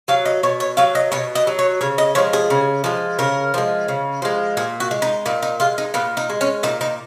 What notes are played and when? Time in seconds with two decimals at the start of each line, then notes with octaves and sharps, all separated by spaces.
0.08 F#3 F5
0.25 D#5
0.43 B2 C#5
0.60 C#5
0.77 F#3 F5
0.95 D#5
1.12 B2 C#5
1.35 D#5
1.47 F#3
1.59 C#5
1.81 C#3 C#5
1.98 D#5
2.15 F3 G#3 C#5
2.33 G#4
2.50 C#3
2.84 F3 G#3
3.19 C#3 A#4
3.54 F3 G#3
3.88 C#3
4.22 F3 G#3
4.57 A#2 G#4
4.80 F#4
4.91 G#3
5.02 D#4
5.26 A#2 D#4
5.42 D#4
5.60 G#3 F4
5.78 D#4
5.94 A#2 B3
6.17 D#4
6.30 G#3
6.41 C#4
6.63 A#2 D#4
6.81 D#4